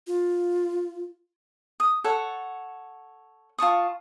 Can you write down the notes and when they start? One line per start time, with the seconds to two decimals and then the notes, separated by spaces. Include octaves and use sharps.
0.07 F4
1.80 D#6
2.04 A4 C#5 F#5
3.58 F4 A5 C#6 D#6